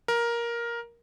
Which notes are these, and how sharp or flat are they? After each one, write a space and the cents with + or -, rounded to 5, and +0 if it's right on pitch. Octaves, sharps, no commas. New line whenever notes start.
A#4 +10